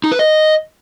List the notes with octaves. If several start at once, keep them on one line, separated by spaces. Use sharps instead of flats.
D#4
B4
D#5